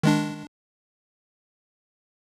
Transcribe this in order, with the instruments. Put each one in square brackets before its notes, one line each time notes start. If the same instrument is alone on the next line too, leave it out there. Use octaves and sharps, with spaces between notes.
[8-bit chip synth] D#3 G#3 D4